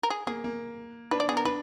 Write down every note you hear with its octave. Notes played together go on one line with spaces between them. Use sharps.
A#4
G#4
A#3 G#4
A#3
D4 B4
D5
B3 G#4
A#4
D4 B4